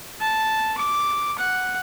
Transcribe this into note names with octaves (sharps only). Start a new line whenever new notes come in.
A5
D6
F#5